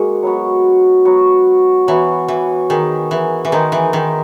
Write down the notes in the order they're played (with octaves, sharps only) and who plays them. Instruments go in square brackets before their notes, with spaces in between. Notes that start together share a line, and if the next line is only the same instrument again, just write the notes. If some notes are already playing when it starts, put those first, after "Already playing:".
Already playing: [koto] G#3 A#3 [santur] F#4
[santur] F#3 B3 F#4
F#3 B3 F#4
[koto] E3 [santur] F#3 B3 F#4
[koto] E3
[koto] D#3 [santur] G#3 D#4 G#4
[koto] E3
E3
[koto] D#3 [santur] G#3 D#4 G#4
[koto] E3
D#3